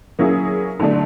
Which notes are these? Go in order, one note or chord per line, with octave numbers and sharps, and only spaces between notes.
F#3 A#3 C#4 E4 G#4
D3 F#3 A3 D4